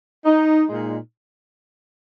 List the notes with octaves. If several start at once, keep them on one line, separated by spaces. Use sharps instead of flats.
D#4
A#2 G#3 D#4